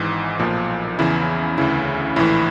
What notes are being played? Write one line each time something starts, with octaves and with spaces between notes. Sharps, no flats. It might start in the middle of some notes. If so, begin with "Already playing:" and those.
Already playing: G#1 G#2 E3
B1 A#2 F3
E2 C#3 E3 E4
D2 C#3 E3 E4
A#1 A2 E3 E4